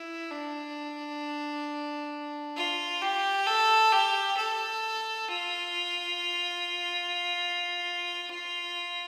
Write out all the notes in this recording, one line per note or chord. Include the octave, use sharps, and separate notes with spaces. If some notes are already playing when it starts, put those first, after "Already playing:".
Already playing: E4
D4
F4
G4
A4
G4
A4
F4